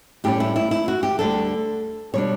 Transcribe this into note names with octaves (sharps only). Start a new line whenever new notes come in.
A2 G3 C#4 G4
E4
E4
E4
F#4
G4
D2 D3 G3 D4 A4
B2 G3 D4 C#5